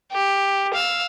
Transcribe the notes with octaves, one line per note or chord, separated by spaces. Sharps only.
G4
F5 E6